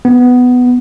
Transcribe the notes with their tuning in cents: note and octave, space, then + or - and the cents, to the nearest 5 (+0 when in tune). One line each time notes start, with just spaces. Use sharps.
B3 +10